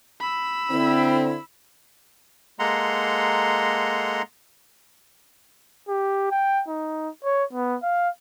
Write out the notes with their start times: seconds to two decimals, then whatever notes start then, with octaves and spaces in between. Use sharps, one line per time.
0.20 B5 E6
0.70 D3 C4 E4
2.59 G#3 A#3 A4 F#5 A#5 C6
5.89 G4
6.31 G5
6.68 D#4
7.24 C#5
7.53 B3
7.83 F5